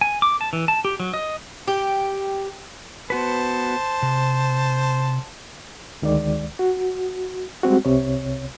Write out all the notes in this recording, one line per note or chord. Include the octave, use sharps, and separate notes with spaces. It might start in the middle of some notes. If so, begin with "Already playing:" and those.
G#5
D6
A5
E3
A5
G4
F#3
D#5
G4
B3 F#4 B4 C5 A5
C3
D2 D#3 G#3 D5
F#4
G3 G#3 C4 F#4
C2 C3 C#5